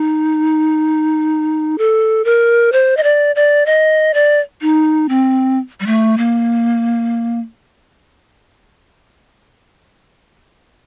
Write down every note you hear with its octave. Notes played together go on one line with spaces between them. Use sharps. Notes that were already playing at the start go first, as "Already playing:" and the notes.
Already playing: D#4
A4
A#4
C5
D#5
D5
D5
D#5
D5
D#4
C4
G3
A3
A#3